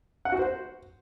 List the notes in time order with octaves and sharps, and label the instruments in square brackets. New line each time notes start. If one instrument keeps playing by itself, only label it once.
[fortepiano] F#5
F#4
C5